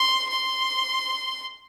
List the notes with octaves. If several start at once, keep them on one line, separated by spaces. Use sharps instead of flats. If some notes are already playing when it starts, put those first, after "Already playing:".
Already playing: C6
C6